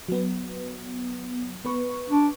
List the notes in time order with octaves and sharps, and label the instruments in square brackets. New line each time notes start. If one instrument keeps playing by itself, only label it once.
[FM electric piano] F#3 B3
B3 B4 C#6
[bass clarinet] D4